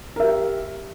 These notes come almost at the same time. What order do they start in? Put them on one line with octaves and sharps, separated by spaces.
A#4 E5 G4